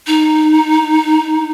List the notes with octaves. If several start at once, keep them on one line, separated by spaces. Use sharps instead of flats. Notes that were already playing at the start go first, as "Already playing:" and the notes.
D#4